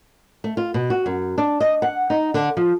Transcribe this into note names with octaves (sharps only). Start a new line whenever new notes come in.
A3
F4
B2
F#4
F#2
D4
D#5
F#5
D#4
D3
F3